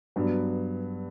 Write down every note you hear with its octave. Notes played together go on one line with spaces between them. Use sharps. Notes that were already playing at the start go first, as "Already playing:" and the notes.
G2 F#3 B3